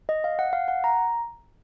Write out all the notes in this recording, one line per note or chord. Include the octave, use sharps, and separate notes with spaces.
D#5
F5
F#5
F5
F#5
A#5